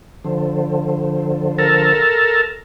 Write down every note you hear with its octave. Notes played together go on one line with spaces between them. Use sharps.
D3 F3
A4 A#4